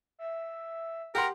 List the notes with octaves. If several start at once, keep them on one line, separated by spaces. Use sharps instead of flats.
E5
G4 A#4 F#5 C6